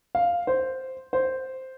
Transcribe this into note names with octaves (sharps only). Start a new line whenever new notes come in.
F5
C5
C5